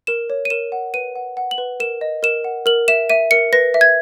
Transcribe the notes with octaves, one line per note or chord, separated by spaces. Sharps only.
A#4 E7
C#5
D#7
A#4 E7
F#5
B4 D#7
F#5
F#5
F#7
B4
A#4 E7
D#5
A#4 E7
F#5
A#4 F#7
E5 E7
E5 D#7
A#4 C#7
B4 A#6
E5
G#6